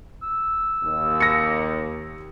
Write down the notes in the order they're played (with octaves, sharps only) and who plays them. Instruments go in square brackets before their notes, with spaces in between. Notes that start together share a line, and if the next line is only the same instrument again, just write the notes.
[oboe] E6
[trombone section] D#2
[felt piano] A#6 C#7